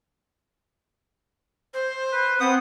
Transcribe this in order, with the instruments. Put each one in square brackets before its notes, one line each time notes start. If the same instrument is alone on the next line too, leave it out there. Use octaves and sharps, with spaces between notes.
[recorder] C5
[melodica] B4
[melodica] B3 F#5 D#6 [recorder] C4